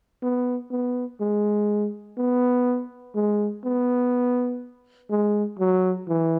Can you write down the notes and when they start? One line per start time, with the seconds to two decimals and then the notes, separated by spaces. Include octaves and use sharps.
0.23 B3
0.71 B3
1.21 G#3
2.18 B3
3.15 G#3
3.64 B3
5.10 G#3
5.59 F#3
6.08 E3